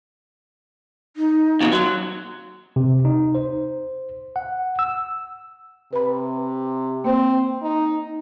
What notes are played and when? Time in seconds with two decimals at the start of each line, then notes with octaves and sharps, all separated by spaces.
1.17 D#4
1.61 D#2 B2
1.73 F#3 C6
2.76 C3
3.05 D#4
3.35 C5
4.36 F#5
4.79 E6
5.93 C3 B4 B5
7.04 A#3 C4 C5
7.62 D#4